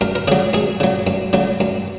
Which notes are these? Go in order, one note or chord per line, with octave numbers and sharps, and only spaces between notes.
F#2 A#4
A#4
C#3 F#3 G#4
F#2 G#4
C#3 F#3
F#2
C#3 F#3
F#2